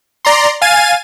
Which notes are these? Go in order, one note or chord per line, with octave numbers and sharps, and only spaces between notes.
D5 A#5 C6
F5 G#5 A6 D#7